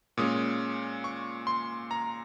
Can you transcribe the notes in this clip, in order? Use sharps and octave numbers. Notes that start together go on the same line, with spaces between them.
A#2 G#3 C#4 D#6
C#6
C6
A#5